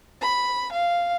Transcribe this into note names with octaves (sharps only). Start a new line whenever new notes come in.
B5
F5